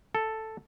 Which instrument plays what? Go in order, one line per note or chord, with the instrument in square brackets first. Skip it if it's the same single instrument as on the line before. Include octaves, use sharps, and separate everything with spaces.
[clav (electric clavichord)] A4